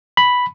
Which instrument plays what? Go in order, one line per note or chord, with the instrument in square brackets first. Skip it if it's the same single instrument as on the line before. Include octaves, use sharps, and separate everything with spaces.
[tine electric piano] B5